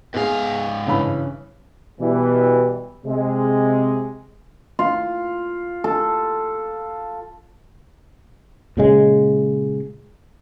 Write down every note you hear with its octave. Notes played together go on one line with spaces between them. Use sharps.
G#2 B3 G#4 F5
G2 C#3 E3 B5
B2 E3 G3
C3 G#3
F4
A4
A#2 C#3 G#3